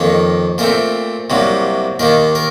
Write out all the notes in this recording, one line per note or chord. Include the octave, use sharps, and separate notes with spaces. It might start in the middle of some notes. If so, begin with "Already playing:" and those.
Already playing: F2 D#3 A#3 C#5
A#2 A3 C4 A#4
C2 C3 F#3 A#3
D#2 D#3 A#3 A#4
A#4